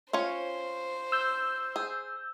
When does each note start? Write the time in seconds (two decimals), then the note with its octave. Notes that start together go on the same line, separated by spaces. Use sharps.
0.13 C#4 F4 C5 C#5
1.12 E6 G6
1.76 G#4